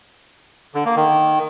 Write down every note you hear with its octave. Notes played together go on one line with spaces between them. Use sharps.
D3
A#3
D#3